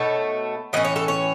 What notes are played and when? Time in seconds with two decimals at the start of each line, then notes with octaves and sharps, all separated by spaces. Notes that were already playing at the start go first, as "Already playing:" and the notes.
Already playing: B2 A3 D#4 C#5
0.73 A2 E3 C#4 D#5
0.85 C#5
0.96 A4
1.08 C#5